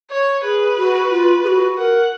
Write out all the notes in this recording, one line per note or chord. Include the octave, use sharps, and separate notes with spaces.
C#5
G#4 B4
F#4
F4
G#4
F#4
A#4 F#5